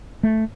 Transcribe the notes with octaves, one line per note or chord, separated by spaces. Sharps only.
A3